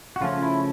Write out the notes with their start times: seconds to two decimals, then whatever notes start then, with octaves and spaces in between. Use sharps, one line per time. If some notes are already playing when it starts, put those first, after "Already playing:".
0.16 F#4
0.21 C#3 F3 A3 C#4 F4
0.43 E4